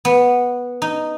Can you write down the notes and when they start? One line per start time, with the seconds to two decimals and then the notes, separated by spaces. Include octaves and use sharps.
0.05 B3
0.82 D#4